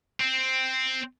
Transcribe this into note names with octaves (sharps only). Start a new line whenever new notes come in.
C4